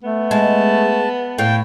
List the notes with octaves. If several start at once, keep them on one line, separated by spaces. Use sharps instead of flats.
A3 B3
G#3 A5
A2 F5 G5